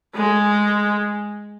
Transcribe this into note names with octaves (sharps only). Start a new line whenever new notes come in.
G#3